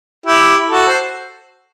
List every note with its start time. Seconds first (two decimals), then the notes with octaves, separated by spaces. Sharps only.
0.26 E4 G4
0.70 F#4 A4
0.87 C5